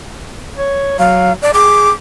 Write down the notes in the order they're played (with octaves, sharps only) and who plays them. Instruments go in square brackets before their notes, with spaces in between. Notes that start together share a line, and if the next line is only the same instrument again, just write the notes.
[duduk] C#5
[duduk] F#3 [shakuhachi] F5
[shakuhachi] D5
[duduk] G#4 [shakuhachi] D6